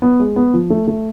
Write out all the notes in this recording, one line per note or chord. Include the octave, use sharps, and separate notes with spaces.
B3
G#3
B3
F3
A3
A3